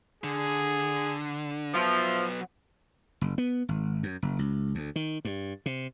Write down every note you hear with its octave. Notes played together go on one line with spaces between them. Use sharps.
D3 G#4
F3 F#3 B3 E5
F#1
B3
G#1
F#2
F#1
C#2
D2
D#3
G2
C3